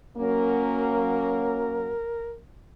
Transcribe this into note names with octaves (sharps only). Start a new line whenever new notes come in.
F#3 A#3 C#4 A#4